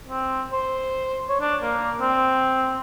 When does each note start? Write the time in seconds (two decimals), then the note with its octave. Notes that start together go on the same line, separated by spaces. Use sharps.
0.08 C4
0.53 C5
1.29 C#5
1.41 D4
1.62 A#3
2.01 C4